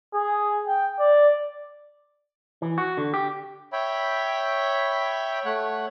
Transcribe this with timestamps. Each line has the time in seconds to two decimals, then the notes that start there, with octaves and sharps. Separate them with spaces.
0.14 G#4
0.67 G5
1.00 D5
2.62 E3
2.78 F#4
2.97 D3
3.14 G4
3.73 C#5 E5 G5 B5
5.45 A3 C#5 F#5